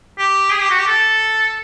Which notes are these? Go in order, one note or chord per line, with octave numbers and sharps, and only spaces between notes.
G4
G#4
G4
F#4
G4
A4